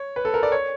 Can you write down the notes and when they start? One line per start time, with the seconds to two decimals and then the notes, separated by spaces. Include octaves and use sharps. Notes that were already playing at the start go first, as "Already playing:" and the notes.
Already playing: C#5
0.16 B4
0.25 A4
0.34 A#4
0.43 D5
0.52 C#5